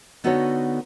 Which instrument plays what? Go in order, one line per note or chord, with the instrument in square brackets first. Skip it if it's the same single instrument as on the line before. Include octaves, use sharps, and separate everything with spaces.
[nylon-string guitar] D3 B3 D#4 F#4 A4 C#5